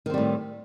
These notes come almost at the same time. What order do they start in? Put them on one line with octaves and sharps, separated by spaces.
D#3 C4 G3 A2